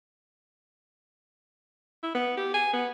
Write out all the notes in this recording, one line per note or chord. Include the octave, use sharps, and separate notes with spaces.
E4
B3
G4
G#5
B3